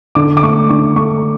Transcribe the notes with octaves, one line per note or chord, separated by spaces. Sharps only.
D3 D6
D6
A3 C#6
D3 C#6
A3 C#6